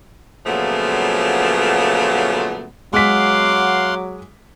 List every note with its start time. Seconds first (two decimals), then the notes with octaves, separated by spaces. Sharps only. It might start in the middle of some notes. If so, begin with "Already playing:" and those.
0.46 A#2 C#3 F3 F#3 A3 B3
2.93 F#3 G#3 F5 F#5 C6 D6 B6